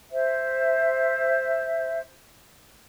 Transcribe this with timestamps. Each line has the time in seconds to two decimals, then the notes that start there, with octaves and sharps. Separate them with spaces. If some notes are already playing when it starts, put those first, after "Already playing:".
0.12 C5 E5